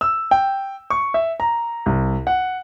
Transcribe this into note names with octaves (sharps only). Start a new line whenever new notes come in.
E6
G5
C#6
E5
A#5
C2
F#5